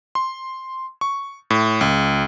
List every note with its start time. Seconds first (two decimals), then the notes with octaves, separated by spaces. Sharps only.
0.15 C6
1.01 C#6
1.50 A2
1.81 C#2